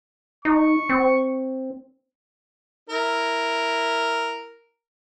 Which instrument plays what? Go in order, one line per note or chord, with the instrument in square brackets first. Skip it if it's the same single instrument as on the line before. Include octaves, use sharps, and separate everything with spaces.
[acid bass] D#4 [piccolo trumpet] C#6
[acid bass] C4
[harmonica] E4 A#4